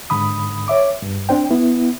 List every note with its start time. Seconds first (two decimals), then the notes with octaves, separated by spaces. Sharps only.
0.10 G#2 D3 B5 D#6
0.68 C#5 E5 D6
1.02 G2
1.29 C4 D4 C5 G5
1.51 B3 E4